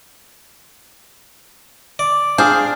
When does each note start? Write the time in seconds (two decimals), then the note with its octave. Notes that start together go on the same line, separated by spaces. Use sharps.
1.99 D5
2.38 D4 G#4 C5 F5